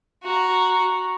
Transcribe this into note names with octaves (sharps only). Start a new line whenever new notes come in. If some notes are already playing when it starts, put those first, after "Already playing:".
F#4 A#5